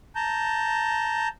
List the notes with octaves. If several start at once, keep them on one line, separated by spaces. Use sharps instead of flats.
A5 A#5 G6